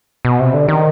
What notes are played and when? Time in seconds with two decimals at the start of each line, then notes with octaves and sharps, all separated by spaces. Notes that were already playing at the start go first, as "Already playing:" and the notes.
0.25 B2
0.40 C3
0.54 D3
0.68 D#3